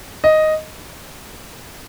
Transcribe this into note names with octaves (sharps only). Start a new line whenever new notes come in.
D#5